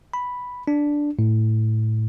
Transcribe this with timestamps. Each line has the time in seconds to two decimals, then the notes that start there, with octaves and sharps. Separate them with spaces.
0.14 B5
0.68 D4
1.19 A2